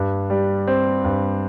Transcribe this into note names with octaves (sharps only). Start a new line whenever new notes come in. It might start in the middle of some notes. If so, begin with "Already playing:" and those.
Already playing: G2
G3
C4
G2